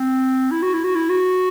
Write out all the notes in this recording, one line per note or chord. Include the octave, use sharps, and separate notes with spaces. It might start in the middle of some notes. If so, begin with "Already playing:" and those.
Already playing: C4
E4
F#4
E4
F#4
E4
F#4